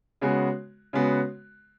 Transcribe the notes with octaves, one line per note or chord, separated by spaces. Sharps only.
C#3 G#3 B3 F#4
C#3 G#3 B3 F#4